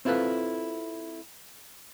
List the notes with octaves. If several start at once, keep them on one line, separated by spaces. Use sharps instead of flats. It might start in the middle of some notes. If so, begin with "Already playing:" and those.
C4 E4 F4 A4 B4